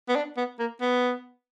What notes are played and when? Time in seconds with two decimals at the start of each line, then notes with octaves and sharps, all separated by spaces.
0.09 B3
0.16 D4
0.37 B3
0.59 A#3
0.81 B3